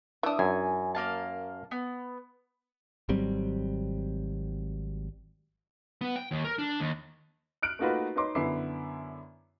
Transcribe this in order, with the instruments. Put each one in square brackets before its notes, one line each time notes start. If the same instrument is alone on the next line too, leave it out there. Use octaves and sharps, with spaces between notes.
[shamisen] E3 D4 [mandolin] E5 D#6
[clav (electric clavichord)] F#2 [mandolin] G#5
[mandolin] A#3 F5 A5
B3
[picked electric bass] G#1 F#3 G3 C4
[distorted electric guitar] B3
G5
D#2
A#4
D4
D#2
[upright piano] F6 F#6 D7
A3 A#3 D#4 F4 F#4 B4
D#4 B4 C#5 D#5 C6 D6
F#2 D3 B3 E4 D6 C7